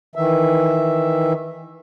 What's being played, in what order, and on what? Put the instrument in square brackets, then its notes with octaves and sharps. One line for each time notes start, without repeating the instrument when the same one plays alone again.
[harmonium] D#3 E3 E5